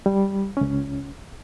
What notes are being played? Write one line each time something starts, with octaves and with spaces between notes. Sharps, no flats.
G3
C#2 C#4